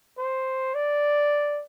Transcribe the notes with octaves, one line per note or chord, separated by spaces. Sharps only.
C5
D5